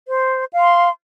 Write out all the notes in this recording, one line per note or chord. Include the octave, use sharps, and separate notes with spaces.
C5
F5
C6